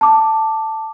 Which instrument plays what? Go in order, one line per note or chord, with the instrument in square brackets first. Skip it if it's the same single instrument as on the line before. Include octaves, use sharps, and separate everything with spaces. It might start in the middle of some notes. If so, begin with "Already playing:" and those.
[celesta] A5 D6